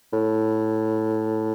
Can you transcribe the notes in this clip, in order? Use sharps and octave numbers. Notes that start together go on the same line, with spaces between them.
A2